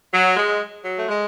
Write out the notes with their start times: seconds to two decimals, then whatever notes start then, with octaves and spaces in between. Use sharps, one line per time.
0.13 F#3
0.37 G#3
0.84 F#3
0.97 A3
1.08 G#3